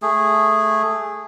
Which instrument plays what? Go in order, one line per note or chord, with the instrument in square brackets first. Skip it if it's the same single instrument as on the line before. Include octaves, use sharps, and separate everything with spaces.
[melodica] A3 G#4